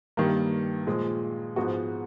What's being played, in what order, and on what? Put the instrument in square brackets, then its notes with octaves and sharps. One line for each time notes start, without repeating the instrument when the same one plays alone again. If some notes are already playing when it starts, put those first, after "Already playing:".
[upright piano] G2 D#3 G3 A#3
A#2 F3 G#3
G#2 F3 G#3 B3 F#4